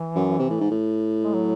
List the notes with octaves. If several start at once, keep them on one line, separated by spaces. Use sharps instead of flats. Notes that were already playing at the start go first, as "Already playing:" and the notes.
Already playing: E3
F#2
C3
A2
G#2
A2
G#3
F#3